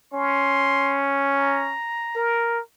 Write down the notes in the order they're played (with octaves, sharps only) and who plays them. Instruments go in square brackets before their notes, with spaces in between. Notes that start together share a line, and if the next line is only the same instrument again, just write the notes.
[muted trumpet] C#4 [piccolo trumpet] C6
[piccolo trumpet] A#5
[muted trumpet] A#4